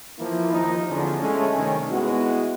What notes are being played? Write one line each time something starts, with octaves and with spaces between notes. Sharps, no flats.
E3 F3 A#3 E4
D#2 F3 D#4
E2 D3 F3 C#4 D4
G#3 A3 C#4
G2 C3 D#3 C#4
G#3 B3 E4 F#4